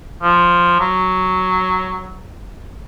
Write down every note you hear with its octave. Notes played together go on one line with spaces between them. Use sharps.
F3
F#3